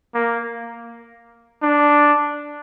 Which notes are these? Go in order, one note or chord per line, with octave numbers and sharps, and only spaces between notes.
A#3
D4